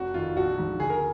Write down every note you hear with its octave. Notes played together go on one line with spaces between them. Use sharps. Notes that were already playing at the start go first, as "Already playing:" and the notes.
Already playing: F1 F#4
F2 D#3 F4
A#1 F#4
G#2 F3
D2 G#4
A#4